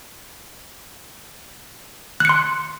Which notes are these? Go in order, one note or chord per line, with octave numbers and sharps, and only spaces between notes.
C6 F#6 C#7